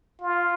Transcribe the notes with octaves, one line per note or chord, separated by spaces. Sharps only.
F4